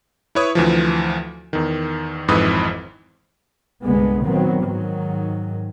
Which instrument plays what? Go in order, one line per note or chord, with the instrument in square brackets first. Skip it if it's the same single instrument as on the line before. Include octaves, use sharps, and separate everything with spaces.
[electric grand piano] E4 B4 C#5 C#6 D#6
D2 E3 F3
E2 D#3
G#1 F2 G#2 E3 B4 D#6
[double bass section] C2 G2 D3 G#3 B3
A#2 D#3 F#3 B3 C4
G#2 D#3 F#3